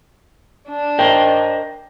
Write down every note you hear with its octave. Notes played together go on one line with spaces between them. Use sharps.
D4
A#4 C5 D#5 G5